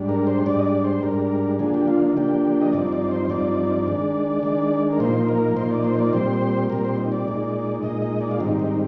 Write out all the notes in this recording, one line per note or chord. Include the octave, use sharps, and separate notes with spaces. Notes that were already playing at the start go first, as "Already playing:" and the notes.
Already playing: G#2 G3 D4
A#4
C5
G#2 G3 D4 D5
D#5
D5
C5
G#2 G3 D4 A#4
D3 F3 A#3 D4 G#4
G4
F4
D#4
D3 F3 A#3 D4 G4
D#5
G2 F3 C4 D#4 D5
D5
C5
C5
G2 F3 C4 D#4 D5
D#3 G#3 D4
D#3 G#3 D4
A#4
A#2 F3 A#3 D#4 C5
A#4
A#2 F3 A#3 D#4 C5
D5
C5
D5
A#2 G3 C4 C5
A#2 G3 C4 A#4
C5
D#4
D5
A#2 G#3 D#4
A#2 G#3 D#4 D#5
D#5
D5
F4
G#2 D#3 G3 C4 D#4
D#4